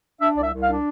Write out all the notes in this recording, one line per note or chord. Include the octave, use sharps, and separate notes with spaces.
D4 E5
C2 D5
E5
C2
F5
D4